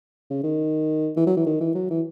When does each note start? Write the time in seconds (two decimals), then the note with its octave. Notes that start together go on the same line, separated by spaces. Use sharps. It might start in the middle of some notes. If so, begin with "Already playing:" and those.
0.30 C#3
0.43 D#3
1.17 E3
1.27 F#3
1.37 E3
1.46 D#3
1.61 E3
1.75 F#3
1.90 E3